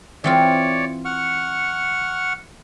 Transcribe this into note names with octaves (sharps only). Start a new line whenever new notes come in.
E3 C4 F4 C#5 D5
F#5 C#6 F6